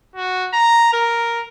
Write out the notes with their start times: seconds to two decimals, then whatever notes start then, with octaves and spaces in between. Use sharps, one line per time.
0.16 F#4
0.53 A#5
0.93 A#4